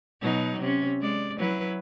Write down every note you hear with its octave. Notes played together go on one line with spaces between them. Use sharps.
B2 F#3 D#4
C3 C#4
G#3 D5
F#3 E4 B4